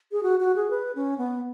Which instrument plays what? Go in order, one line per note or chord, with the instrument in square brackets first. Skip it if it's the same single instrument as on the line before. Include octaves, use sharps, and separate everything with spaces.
[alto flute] G#4
F#4
F#4
G#4
B4
C#4
B3